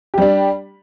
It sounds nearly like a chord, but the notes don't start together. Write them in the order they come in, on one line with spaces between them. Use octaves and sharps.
G4 G3 D4